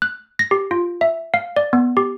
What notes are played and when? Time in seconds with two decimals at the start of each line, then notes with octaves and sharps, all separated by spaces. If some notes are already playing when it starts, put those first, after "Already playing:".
0.02 F#6
0.39 A#6
0.51 G4
0.71 F4
1.01 E5
1.34 F5
1.56 D5
1.73 B3
1.97 G4